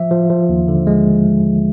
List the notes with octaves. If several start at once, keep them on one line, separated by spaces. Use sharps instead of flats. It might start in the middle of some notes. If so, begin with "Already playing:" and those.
Already playing: F3 E5
F3
F3
D#2
D3
G#3